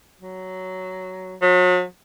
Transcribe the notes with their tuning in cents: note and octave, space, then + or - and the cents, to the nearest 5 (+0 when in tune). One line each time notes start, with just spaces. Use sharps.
F#3 +10
F#3 -40